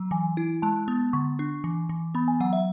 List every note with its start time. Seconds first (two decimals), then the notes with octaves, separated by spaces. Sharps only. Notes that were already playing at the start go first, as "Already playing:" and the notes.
Already playing: F#3
0.11 E3 G#5
0.37 E4
0.62 G#3 A5
0.88 B3
1.13 D3 C#6
1.39 D4
1.64 E3
1.89 E3
2.15 B3 B5
2.28 G#5
2.40 F#3 F#5
2.53 E5